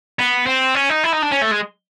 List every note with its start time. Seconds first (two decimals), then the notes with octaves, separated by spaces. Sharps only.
0.19 B3
0.46 C4
0.75 C#4
0.89 D#4
1.04 E4
1.12 D#4
1.22 D4
1.31 C#4
1.41 A3
1.51 G#3